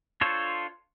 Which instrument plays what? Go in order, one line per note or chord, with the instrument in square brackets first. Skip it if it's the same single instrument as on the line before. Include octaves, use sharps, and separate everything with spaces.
[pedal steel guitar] D4 F4 A4 C5 C#5